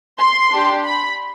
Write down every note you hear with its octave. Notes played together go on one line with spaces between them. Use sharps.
C6
D4 G4
B5